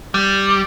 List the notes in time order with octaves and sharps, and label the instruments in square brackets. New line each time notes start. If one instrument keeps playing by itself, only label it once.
[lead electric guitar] G3